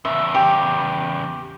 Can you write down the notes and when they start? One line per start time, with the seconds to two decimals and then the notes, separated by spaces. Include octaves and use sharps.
0.05 E2 C#3 E5
0.35 G4